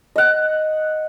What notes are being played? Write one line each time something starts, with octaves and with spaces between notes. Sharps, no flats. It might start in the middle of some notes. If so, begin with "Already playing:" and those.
D#5 F#5